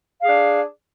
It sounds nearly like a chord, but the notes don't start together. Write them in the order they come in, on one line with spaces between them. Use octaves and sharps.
F5 G#4 D4